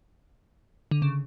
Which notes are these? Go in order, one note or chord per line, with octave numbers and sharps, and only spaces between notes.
D3
C#3